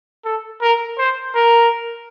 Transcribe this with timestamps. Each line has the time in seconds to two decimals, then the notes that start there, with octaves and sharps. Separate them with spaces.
0.25 A4
0.62 A#4
0.98 C5
1.35 A#4